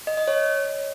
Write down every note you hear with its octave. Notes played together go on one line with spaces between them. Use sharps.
D#5
D#5
C#5